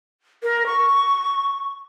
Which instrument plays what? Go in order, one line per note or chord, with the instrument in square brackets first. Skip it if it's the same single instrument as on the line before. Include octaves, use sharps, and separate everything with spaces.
[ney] A#4
C#6